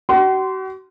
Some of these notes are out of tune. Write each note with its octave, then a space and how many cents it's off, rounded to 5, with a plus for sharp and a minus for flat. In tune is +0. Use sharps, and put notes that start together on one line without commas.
F#4 +40 C6 -15